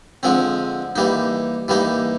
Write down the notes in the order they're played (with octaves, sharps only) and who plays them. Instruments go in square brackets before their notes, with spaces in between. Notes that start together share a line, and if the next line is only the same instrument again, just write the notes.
[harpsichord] D3 F3 G#3 C4
E3 G3 A#3 D#4
E3 G3 A#3 D#4